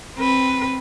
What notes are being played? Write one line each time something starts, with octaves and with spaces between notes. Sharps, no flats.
C4 B4